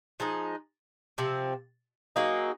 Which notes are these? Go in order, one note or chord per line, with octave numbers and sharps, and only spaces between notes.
F3 G#3 D#4
C3 F3 C4
F#3 A#3 D#4 G#4